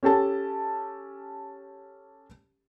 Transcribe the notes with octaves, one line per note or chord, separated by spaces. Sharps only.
C#4 G4 A4 A5